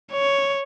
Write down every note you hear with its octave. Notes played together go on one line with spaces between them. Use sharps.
C#5